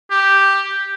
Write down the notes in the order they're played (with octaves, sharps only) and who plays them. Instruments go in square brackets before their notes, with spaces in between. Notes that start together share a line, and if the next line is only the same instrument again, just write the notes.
[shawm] G4